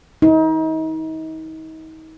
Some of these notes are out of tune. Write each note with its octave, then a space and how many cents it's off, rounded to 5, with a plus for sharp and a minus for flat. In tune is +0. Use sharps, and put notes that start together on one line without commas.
D#4 +35